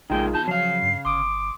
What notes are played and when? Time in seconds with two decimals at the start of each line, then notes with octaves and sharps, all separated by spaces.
0.10 A#1 C#3 G#3 A#3 D#4 F4 G#4 G5
0.33 E2 B2 A5 G6
0.47 C#3 F3 F#3 F5 C7
0.82 G2
1.05 G1 C6 D6 D#6